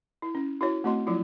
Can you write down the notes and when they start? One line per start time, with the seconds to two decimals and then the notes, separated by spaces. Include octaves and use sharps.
0.22 E4
0.35 C#4
0.61 E4 F#4 C#5
0.84 A3 C4 F#4 D#5 C6
1.07 F3 F#3 E4 F4